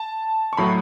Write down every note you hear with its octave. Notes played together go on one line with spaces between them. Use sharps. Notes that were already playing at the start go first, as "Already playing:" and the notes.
Already playing: A5
C#6
A2 F#3 A3 B5